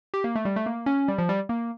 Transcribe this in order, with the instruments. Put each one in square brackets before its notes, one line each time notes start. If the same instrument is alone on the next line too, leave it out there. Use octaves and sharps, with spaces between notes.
[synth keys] G4
A#3
A3
G3
A3
A#3
C#4
G3
F3
G3
A#3